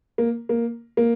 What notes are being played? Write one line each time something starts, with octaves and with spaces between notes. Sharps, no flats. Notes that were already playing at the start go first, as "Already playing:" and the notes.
A#3
A#3
A#3